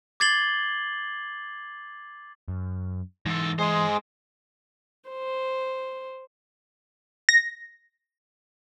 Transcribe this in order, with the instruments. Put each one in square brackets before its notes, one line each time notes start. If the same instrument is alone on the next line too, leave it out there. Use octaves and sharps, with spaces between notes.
[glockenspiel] D6 G#6 A6 C7 F#7 G7
[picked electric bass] F#2
[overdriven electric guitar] G#2 A4 [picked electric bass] E3
[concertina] G#3 G#4 [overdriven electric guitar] C5 D#5
[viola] C5
[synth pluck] A#6